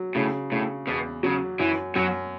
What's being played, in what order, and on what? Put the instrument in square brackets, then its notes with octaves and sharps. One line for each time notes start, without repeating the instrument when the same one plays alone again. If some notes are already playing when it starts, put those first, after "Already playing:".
Already playing: [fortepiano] F#3
[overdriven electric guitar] A2 [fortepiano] C#3
[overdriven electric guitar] A2 [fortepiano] C#3
[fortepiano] E2 [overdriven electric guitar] B2
[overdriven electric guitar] C#3 [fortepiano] F#3
[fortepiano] F#2 [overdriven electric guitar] E3
[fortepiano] F#2 [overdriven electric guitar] F#3